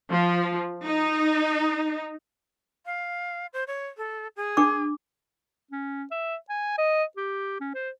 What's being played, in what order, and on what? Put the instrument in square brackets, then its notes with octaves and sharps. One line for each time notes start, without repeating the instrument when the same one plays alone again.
[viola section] F3
D#4
[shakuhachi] F5
C5
C#5
A4
G#4
[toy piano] D4 D6
[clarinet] C#4
E5
G#5
D#5
G4
C#4
C5